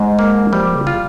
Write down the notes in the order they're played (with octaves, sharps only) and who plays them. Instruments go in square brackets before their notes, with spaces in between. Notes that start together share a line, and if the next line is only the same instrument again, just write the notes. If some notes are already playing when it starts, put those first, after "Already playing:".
Already playing: [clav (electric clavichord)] G#2 [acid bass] G#3
[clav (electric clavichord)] A#3
[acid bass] F3 [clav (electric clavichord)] G3
[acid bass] C#3
[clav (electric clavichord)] F4